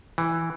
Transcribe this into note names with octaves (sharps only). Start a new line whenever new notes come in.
E3